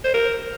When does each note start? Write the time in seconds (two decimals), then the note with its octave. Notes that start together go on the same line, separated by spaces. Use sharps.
0.05 C5
0.14 A#4